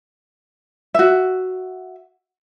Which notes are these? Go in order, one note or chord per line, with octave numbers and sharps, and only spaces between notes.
F#4 E5